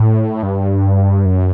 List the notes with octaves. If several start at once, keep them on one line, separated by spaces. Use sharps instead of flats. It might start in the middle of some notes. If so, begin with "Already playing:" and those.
Already playing: A2
G2
F#2